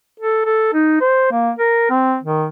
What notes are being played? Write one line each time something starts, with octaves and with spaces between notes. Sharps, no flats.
A4
A4
D#4
C5
A#3
A#4
C4
D#3